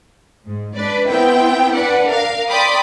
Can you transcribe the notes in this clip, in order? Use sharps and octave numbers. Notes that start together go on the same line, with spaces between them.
G#2
D4 B4 D5
B3 C4 E4 G5
D4 B4 D5 F#5
A#4 F5
D5 G5 B5 C6 D6 D#6